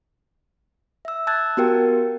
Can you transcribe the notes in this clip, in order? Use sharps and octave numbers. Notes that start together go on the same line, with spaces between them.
E5 E6
A5 E6 F#6 G#6 A6
B3 F#4 G4 A#4 G5